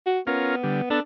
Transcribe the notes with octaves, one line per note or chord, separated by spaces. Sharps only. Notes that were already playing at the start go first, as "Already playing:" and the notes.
F#4
B3 C#4 F4 A#4
D3 G3
B3 D4 A4